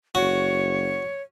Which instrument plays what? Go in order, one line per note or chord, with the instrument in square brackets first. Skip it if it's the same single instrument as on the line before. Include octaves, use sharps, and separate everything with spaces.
[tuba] F#1 [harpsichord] F#4 [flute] C#5